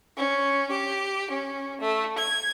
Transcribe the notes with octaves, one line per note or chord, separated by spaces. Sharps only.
C#4
G4
C#4
A3
G#6